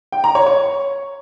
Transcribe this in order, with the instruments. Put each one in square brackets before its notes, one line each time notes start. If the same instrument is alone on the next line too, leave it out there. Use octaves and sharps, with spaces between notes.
[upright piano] G5
A#5
C#5
C#5